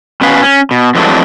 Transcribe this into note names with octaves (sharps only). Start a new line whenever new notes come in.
B2 C#4 B4 F5
C#4
B2
F2 E3 F#3 G#3 A3 D4